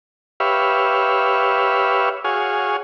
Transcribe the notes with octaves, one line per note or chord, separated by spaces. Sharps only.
G4 B4 C#5 E5 F5
F#4 G#4 C#5 F5 G#5